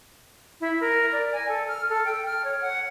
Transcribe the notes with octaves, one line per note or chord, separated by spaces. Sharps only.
E4
A#4
D5
G#5
A4
F6
A4
G5
F6
C#5
F#5